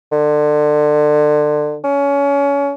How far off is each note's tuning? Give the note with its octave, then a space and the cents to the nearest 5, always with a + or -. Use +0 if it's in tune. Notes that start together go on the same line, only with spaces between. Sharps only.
D3 +30
C#4 +25